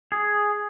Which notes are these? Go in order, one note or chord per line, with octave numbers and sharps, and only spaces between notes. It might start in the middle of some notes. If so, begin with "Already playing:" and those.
G#4